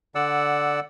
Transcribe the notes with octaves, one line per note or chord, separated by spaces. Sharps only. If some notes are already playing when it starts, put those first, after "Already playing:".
D3 D5 F#5 E6